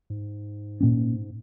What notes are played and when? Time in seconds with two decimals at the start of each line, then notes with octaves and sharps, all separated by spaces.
0.10 G#2
0.81 A#2 A#3 C#4